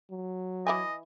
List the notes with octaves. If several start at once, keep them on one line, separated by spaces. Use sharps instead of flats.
F#3
E3 E4 D#5 G#5